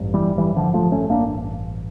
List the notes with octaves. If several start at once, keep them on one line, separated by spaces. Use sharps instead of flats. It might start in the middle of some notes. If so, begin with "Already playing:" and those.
Already playing: A1 G2
E3 G3
E3 G3
D3 F3
F3 A3
A3 C#4
A#3 D4